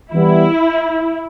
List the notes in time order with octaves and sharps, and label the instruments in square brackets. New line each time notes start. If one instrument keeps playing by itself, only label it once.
[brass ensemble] E3 G3 B3 [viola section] E4